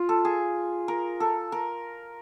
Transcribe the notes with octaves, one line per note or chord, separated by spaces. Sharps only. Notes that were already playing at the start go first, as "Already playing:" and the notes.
Already playing: F4
A4
G#4
A#4
A4
A#4